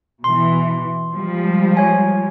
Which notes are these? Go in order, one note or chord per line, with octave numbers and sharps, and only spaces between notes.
B2 E3 C6
F3 G3 G#3
C#5 G#5